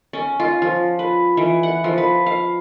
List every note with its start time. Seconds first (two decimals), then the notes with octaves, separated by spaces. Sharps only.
0.13 C#4
0.40 F4
0.62 F3
0.99 B4
1.37 E3
1.63 F#5
1.84 F3
1.98 B4
2.26 F5